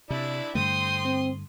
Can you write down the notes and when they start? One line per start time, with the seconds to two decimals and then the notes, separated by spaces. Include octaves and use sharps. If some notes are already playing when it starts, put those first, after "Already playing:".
0.10 C3 D4 E4 D5 E5
0.55 G2 D3 A3 C5 G5 C6 D#6
1.05 C4